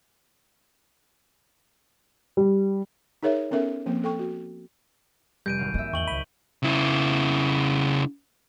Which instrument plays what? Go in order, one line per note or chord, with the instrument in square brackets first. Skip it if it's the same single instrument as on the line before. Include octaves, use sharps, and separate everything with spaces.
[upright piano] G3
[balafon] D#4 G#4 A#4 C#5 E5
B3 C#4 A4 A#4 E5
F3 A#3 C4
A4 G5 C#6
F#4
[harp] F1 [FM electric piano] G3 [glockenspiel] G6 D7 D#7
[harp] G#1 F#3 F5
[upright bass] A#3 C4 [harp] D#5 E5
[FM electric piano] E2 [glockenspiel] C#6 F#7 G7
[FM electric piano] C#2 B5 [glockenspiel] D#7
[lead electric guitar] C#3 E4